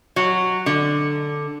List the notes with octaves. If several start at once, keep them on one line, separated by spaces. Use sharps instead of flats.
F#3
D3